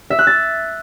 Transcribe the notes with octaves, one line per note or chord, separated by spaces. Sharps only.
E5
F#6
A6